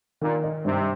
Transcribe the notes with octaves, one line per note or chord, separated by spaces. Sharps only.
A#2 D#3
D#4
G2 C3